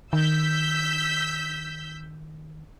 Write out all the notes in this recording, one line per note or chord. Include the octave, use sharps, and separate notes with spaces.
D#3 E6 G6 B6